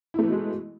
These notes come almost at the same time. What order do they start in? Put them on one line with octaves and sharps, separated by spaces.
E4 A3 E3 B2 G#3